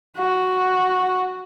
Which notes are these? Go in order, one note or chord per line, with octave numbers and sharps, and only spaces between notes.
F#4